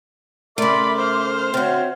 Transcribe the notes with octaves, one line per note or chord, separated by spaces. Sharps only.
C#3 A3 A#4 D5 E5 B5 C6 D6
C5 F6
D3 C4 F#4 C#5 E5